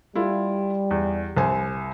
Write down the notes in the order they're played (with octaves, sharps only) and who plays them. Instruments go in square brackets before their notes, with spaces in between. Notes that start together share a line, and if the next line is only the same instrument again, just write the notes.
[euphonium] G3 [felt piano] E4 F4
[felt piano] E2
C2 C5 G#5